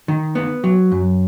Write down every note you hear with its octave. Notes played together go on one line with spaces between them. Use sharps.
D#3
B3
F#3
F#2